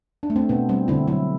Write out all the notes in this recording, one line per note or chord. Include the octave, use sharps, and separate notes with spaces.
D4
A3
C4
B2 B3
G3 C4
D3 C4 E4
F#3 C4 E4